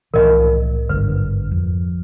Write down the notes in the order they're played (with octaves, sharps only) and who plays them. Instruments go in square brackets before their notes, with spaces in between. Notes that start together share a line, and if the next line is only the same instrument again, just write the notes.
[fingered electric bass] C2 A2 E3 [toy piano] A#4 D#5
[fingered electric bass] G#1 G2 D3 [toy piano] B4
[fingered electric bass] F2